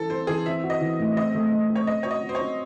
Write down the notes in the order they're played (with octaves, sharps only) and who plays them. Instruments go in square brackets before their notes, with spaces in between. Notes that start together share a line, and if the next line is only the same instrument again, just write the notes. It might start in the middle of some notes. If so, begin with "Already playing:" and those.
Already playing: [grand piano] E3 E4 [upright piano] A4
[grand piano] C4 [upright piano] C5
[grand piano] E3 [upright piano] G#4
[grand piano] C4 [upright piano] E5
[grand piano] F#4
[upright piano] D#5
[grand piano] E3
A2
[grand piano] C4 [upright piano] D#5
[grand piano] A3
C4
C4
[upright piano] C#5
[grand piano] C5 [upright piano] D#5
[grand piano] F#4 [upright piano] C#5
[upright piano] D#5
[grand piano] F#4
[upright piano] C5
C#5
[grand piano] C4